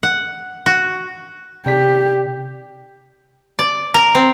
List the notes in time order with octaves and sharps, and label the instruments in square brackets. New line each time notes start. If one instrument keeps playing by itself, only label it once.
[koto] F#5
F#4
[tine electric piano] C3 D5 B6 [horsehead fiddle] G4
[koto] D5
A#4
C4